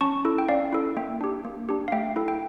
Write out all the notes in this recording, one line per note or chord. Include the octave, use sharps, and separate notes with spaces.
C#4 A5 C#6
E4 A4
G5
C#4 D5 F5
E4 A4
A#3 E5 G5
D4 G4
A#3
D4 G4
F5
A3 E5 G5
E4 A4
G5